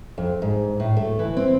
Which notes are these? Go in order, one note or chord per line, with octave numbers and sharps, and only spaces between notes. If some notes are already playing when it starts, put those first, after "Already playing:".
F2
G#2
A2
A3
E3
C4